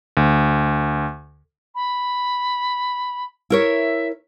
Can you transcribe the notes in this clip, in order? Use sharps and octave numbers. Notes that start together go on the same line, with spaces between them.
D2
B5
E4 A#4 C#5 E5